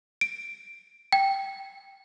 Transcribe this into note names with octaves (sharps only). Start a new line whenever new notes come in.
D7
G5